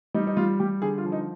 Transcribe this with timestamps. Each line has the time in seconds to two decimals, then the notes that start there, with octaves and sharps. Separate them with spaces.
0.14 G3 D#4
0.27 D#4
0.37 G3 F4
0.60 G3 G4
0.82 D3 G#4
0.98 F4
1.05 F3
1.12 D#4